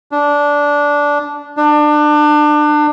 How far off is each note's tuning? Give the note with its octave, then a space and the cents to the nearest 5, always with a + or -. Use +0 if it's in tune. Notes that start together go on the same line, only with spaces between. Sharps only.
D4 -15
D4 +25